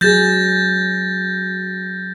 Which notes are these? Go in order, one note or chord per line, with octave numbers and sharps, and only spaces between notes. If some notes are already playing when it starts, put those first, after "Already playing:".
F#3 G#4 G6 A6 A#6